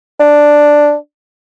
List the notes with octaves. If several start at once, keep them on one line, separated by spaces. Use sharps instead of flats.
D4